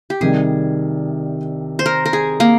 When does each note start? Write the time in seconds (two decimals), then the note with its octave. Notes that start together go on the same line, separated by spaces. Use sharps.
0.10 G4
0.21 C2 C3 D#3 G3 G#4
1.79 C5
1.86 A#4
2.06 A#4
2.13 G#4
2.40 A#3